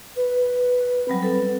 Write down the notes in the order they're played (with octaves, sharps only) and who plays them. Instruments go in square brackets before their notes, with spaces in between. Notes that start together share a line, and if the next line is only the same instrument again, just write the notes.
[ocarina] B4
[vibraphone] F#3 G3 B5 [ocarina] C4
[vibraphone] A4 B4